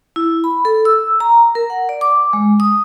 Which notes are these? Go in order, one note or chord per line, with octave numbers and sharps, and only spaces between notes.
E4
B5
A4
E6
A#5
A#4
F#5
D5
D6
G#3
D#6